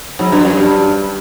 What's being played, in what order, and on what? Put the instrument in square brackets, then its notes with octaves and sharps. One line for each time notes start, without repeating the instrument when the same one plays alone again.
[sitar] G#2 [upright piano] F#3
[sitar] G2
F#2
[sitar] G2 [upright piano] G3